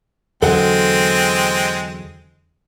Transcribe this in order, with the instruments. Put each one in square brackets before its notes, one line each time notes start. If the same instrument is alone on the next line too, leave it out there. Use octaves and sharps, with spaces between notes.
[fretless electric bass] E2 D3 F#3 [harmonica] G#3 C4 [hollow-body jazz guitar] A4 F#5